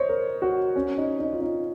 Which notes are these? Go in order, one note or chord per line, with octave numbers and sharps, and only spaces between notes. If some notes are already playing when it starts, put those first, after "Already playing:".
Already playing: C5 C#5 D#5
A#4
F#4
C#4
D#4
D#4
F4
D#4